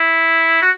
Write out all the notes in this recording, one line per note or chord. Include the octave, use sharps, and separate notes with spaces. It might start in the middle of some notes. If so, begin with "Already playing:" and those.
Already playing: E4
F#4